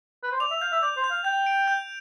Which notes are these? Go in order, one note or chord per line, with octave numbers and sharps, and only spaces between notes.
B4
C5
D5 F7
E5
F5 G6
E5
D5 G6
C5
G6
F5
G5 G6
D7
G6